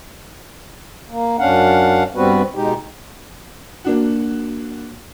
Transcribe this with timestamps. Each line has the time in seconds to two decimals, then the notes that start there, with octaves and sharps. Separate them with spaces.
1.10 A#3
1.39 F#2 C#4 D4 F5 F#5
2.15 G2 G3 B3 C4 F#4 B4
2.55 B2 G#3 D#4 G4
3.84 A#3 D4 F#4